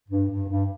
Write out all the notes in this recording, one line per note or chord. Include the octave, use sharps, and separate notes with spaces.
G2
G2
G2